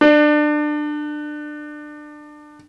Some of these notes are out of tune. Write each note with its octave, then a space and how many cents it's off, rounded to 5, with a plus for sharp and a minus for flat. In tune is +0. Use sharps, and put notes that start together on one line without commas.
D4 +25